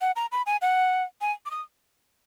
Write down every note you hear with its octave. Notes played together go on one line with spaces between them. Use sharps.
F#5
A#5
B5
G#5
F#5
G#5
D6
D#6